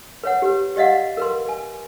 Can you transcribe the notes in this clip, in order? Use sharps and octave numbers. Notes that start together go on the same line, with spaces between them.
B4 C#5 F#5
G4 B4
G4 D5 D#5 F5 F#5
A#4 B4 C6
G#5